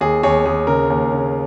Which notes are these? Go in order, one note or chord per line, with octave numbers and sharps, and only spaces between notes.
D#2 G#4
D#2 G#4 C#5
D#2 G#4
C#3 A#4
D#2
C#3